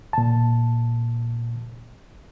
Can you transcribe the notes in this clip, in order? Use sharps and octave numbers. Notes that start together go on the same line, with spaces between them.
A#2 A5